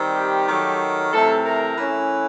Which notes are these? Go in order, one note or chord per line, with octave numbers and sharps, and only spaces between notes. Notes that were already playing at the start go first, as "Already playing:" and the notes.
Already playing: D#3 G3 C4
G4
D#3 F#3 A3
C3 E3 A3 A4
A#4
E3 A3 C#4